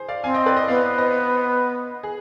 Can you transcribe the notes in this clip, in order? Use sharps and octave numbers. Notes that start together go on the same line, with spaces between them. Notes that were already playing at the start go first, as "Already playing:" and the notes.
Already playing: G#4 C5
D5 F5
C4 F5 G#5
D#5 G5
B4 D5
C5 D#5
B3 D5 F5
C5 D#5
G#4